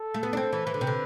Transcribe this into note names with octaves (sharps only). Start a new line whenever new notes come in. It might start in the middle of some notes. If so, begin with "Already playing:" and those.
Already playing: A4
A3
B3
D4
C4
E3
E3 B4
D3
C3
D3